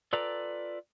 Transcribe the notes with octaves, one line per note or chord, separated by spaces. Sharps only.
F4 A4 B4 D5 G5 A#5